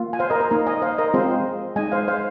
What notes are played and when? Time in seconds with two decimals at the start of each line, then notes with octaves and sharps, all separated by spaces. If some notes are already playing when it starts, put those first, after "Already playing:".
Already playing: A#3 F4
0.13 G#5
0.19 C5 F5
0.30 A#4 D#5
0.40 A#4
0.51 A#3 D#4 A#4
0.67 D#5 G#5
0.82 C5 F5
0.98 A#4 D#5
1.14 G#3 C4 F4 G#4 C5
1.76 G#3 D#4 D#5 G#5
1.92 C5 F5
2.08 C5 F5